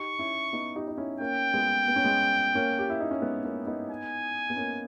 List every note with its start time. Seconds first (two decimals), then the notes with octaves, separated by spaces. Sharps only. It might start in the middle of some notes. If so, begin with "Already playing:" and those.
Already playing: D#4 G4 C#6
0.19 C#4 E4
0.53 B3 D#4
0.75 D#4 G4
0.88 D#4
0.97 C#4 E4
1.20 A#3 C#4 G5
1.54 G#3 B3
1.88 B3
1.96 C#4
2.04 G#3 B3
2.55 A#3 C#4
2.79 G4
2.90 E4
3.00 D#4
3.11 C#4
3.22 G#3 B3
3.44 A#3 C#4
3.67 B3 D#4
3.90 G#5
4.50 B3
4.56 A#3 C#4